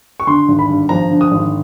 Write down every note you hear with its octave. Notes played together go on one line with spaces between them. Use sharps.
C#6
D3 C6
G#1
B5
G2
F3 A#5
D3
D#6
G#1